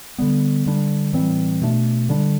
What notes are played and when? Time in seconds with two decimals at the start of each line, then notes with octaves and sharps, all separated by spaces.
0.18 D3 G3 B3
0.66 D3 G3 D4
1.13 A2 E3 G3 C4
1.62 B2 A3 D4
2.09 D3 G3 D4